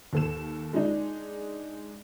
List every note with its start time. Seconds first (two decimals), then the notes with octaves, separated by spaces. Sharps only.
0.13 D#2 A4 E7
0.73 G#3 D4 D#4